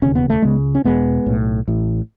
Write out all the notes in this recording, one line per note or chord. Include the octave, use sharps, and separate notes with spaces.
E1 D#2 C#3 C#4
B3
A3
C#2 C#3 G#3 B3
C#4
E1 E2 B2 G#3 B3
B1 A2
A1 A2